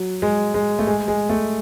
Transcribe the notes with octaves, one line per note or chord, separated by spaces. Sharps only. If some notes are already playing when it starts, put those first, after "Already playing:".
Already playing: F#3
G#3
G#3
A3
G#3
G#3
A3